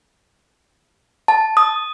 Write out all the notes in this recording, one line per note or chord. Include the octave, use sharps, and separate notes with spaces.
A5
D#6